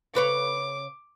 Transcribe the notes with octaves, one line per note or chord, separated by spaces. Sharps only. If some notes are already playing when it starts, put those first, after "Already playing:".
C#3 B4 C#5 D6